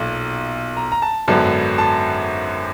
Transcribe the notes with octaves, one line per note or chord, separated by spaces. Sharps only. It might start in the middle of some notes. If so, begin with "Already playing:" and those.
Already playing: B1 A#2
A#5
A#5
A5
G#1 F#2 D3 F#3 B3 A5
A5